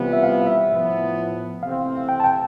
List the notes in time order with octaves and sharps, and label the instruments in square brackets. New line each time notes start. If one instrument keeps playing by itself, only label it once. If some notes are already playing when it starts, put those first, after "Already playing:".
Already playing: [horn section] C3 E3 G3 B3 F4
[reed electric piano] E5
F5
E5
[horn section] A2 F3 B3
[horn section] C3 E3 A3 C4 [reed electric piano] F5
[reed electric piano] G5
A5
G5